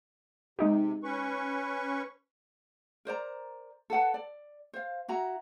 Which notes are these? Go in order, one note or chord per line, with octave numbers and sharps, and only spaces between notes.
C3 G#3 D#4 G4
C#4 B4 C#6
A#4 C5 D5 A#5
A4 B4 F#5 A5
D5
C5 F5
E4 F#4 A#5